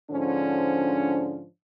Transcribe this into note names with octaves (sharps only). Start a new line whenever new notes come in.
G#2 D3 F3 C#4 D4